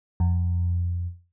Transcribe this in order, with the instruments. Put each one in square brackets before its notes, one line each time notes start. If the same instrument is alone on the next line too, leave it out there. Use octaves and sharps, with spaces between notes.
[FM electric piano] F2